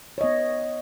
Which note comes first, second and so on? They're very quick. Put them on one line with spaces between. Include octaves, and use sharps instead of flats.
C#5 D#5 B3